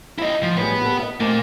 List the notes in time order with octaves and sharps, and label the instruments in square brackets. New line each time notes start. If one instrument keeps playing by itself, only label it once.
[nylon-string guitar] D#2 [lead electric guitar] E4 D#5
[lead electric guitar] F3
[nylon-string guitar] A2 G3 G#4 [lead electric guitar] B3 B4
[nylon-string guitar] G4 A4
D#5 F5
[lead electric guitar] A#2 A#3 [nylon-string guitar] A3 C4